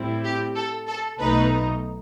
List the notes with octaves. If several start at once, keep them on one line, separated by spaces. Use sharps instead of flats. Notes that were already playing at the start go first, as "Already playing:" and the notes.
Already playing: A2 G3 C4 E4
G4
A4
A4
B1 B2 A3 D#4 B4